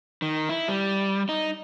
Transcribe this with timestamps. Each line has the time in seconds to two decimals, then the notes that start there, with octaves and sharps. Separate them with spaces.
0.22 D#3
0.49 E4
0.68 G3
1.29 D#4